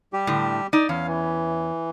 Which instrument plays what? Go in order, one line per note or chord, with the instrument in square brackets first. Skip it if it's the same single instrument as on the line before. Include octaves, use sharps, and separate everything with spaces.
[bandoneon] G3 G4
[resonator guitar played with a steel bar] A2 D3
D#4 D5
[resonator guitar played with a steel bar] E2 C#4 [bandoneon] F5
[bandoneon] E3